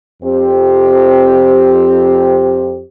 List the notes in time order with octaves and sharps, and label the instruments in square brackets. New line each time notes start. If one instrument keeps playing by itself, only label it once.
[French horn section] F2 C4 G4